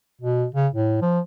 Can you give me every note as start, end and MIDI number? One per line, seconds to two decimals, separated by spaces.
0.22 0.46 47
0.55 0.68 49
0.75 0.97 45
1.02 1.20 53